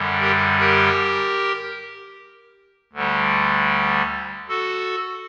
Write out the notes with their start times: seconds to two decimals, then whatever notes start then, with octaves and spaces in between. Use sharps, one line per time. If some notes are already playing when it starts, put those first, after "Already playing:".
Already playing: F#2 D3 G3
0.20 G4 A#4
0.59 G4 A#4
2.93 D2 D3 G3
4.49 F#4 A4